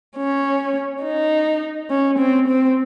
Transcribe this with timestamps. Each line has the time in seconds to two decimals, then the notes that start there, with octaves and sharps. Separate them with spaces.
0.17 C#4
1.03 D#4
1.90 C#4
2.19 C4
2.48 C4